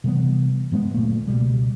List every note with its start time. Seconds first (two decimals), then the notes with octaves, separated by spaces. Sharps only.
0.04 C3 E3 G3 B3
0.71 G2 F#3 G#3 B3
0.94 D2 A#2 A3 A#3
1.27 C#2 B2 G3